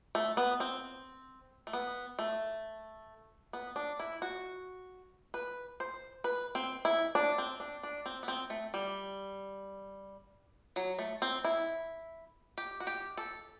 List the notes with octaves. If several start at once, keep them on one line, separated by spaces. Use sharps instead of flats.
A3
B3
C4
A3
B3
A3
B3
D4
E4
F#4
B4
C5
B4
C4
E4
D4
C4
D4
D4
C4
B3
C4
A3
G3
F#3
A3
C4
E4
G4
F#4
G4
A4